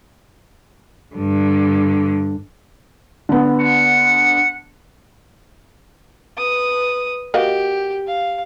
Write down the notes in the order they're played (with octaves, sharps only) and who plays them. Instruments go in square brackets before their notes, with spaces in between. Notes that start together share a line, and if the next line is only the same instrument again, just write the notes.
[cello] G2 D3
[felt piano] D3 B3
[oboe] F#5
[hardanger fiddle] B4 D#6
[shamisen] A#3 F#4 D#5 [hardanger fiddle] G4
[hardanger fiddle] F5